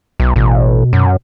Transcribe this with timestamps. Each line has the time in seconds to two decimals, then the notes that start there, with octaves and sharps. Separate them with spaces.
0.20 B1
0.36 A1 B2
0.93 F#2